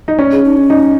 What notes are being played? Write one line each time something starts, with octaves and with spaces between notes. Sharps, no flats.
D#4
C#4
G#4
D#4
C#4
D#4